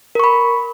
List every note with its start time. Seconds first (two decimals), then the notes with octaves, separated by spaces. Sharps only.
0.15 A#4
0.20 C#6
0.24 B5